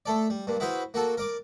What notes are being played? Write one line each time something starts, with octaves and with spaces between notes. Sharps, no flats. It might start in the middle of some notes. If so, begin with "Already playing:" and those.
A3 A4 D5
G3
G2 A#2
E4 F#4 G#4 B4 C5
A#3 F#4 A4
A#4 D5 D6